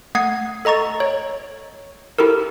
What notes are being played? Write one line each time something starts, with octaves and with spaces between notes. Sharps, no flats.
A3 F#5 D#6 G#6 C7
A4 D#5 A#5 C#6 A6
C#5
E4 G4 A4 A#4